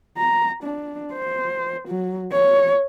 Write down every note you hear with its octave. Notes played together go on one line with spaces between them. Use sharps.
A#5
D4
C5
F#3
C#5